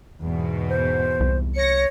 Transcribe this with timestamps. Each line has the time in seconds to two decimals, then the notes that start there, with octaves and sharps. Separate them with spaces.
0.22 E2 G#2 B2
0.69 C5
1.20 C2
1.56 C#5 A#6 C#7